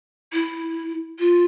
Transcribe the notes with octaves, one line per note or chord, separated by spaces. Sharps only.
E4
F4